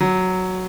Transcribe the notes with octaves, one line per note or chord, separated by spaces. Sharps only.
F#3